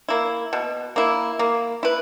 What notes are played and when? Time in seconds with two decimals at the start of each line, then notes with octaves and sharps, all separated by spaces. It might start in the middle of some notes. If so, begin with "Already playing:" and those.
0.09 A#3 E4
0.53 B2
0.96 A#3 E4
1.39 A#3
1.83 E4 B4